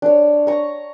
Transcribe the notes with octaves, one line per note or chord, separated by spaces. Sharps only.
D4 C#5
A#5 C#6